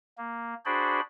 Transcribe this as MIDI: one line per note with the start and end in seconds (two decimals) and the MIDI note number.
0.18 0.54 58
0.65 1.00 62
0.65 1.00 66
0.65 1.00 68
0.65 1.00 72
0.65 1.00 74
0.65 1.00 83